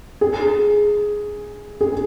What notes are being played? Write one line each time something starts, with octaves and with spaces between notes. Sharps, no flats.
G#4
G#4